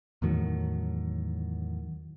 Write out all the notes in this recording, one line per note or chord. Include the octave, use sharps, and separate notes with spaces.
E2 A2 D#3 F#3